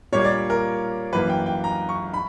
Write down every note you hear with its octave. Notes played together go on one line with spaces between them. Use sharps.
A#2 G3 A#3 C#5
D5
A#4
F#2 E3 A#3 B4
G5
G5
A#5
C#6
B5